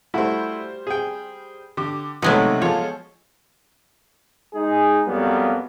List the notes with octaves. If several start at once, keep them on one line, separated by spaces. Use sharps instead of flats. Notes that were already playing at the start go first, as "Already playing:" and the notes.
G3 A3 E4 F#4 C5
G#4 G5
D3 G4 D6
B1 C3 D#3 F3 F#3 G#3 A3 B3
F3 F4 G#4 A4 C#5
G#3 D#4 G#4
F2 F#3 G3 A#3 B3